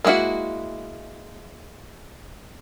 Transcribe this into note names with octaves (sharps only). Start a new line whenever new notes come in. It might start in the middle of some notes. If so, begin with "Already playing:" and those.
G#3 A#3 C#4 E4 F#4